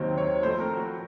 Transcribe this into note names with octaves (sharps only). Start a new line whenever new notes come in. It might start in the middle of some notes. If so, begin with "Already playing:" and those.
Already playing: D#2 D#3 F#3 C4
C#5
A2 F3 A3 C4 C5
A#4
F#4